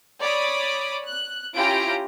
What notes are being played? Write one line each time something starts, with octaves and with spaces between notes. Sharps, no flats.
C#5 D5 B5 D6 D#6
F#6
C#4 E4 F4 G4 A#5 D7